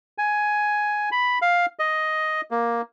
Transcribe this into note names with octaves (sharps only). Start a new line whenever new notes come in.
G#5
B5
F5
D#5
A#3